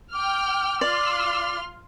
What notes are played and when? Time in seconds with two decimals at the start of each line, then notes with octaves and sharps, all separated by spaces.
0.13 G5 D6 F6
0.81 F4 D5 C6 F6